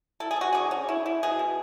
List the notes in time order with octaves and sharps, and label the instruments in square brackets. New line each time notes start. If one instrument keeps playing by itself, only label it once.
[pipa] E4 A4
G#4
E4 F#4
D3 G#4
C#4
E4
E4
B2 G#4
B2